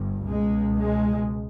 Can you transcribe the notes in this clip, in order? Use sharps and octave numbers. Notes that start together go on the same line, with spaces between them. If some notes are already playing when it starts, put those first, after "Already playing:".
Already playing: G1 G2
C#2 B2 G#3
G#3